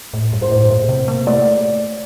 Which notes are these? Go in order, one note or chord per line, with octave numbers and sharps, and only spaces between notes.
A2
G2
C5
A2
A#2
C3
A#3
A3 D5